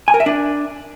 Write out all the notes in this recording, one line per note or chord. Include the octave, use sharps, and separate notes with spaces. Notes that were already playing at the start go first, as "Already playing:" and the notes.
G#5
A#4
E5
D4